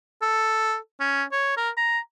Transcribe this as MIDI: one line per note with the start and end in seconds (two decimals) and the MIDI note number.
0.22 0.76 69
1.00 1.23 61
1.32 1.56 73
1.57 1.70 70
1.77 1.99 82